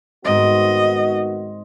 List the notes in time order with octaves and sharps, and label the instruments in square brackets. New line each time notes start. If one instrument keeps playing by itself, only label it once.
[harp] G#2 C4 [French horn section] D#3 B3 F#4 [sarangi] D#5